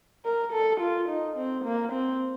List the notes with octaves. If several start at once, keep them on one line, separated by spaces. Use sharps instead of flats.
A#4
A4
F4
D#4
C4
A#3
C4